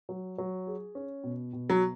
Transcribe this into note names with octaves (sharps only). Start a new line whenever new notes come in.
F#3
F#3
G#4
C#4
B2
B2
F#3